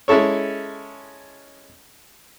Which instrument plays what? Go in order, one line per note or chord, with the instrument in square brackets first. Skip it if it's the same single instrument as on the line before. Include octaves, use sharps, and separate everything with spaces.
[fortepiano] G#3 C#4 E4 A4 C#5